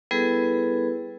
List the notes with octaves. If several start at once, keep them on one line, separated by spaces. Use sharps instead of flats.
G3 B3 E4 G#4 A4 B4